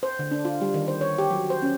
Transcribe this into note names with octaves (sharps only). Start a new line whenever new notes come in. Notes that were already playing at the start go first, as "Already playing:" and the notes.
C5
D3
D4
F4
G3
D#3
C5
C#5
G4
F#3
C5
C#4